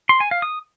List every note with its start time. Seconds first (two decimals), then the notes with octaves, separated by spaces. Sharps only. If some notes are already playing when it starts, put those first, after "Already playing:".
0.09 C6
0.20 G#5
0.31 F5
0.42 D#6